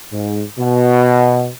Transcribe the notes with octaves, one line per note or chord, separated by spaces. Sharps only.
G#2
B2